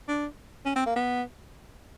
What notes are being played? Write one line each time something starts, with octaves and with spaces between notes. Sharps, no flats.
D4
C#4
C4
A#3
B3